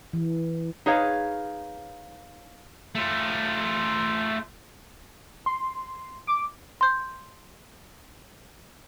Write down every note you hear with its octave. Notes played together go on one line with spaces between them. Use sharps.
E3
D#4 G#4 B4 C#5 F5
A3 F4
C6
D6
C6 G6